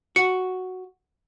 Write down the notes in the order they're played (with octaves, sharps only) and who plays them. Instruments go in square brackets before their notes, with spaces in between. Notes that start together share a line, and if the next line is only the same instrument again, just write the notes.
[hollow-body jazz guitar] F#4 [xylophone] C#7